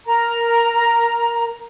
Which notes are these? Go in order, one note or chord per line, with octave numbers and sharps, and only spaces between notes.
A#4 A#5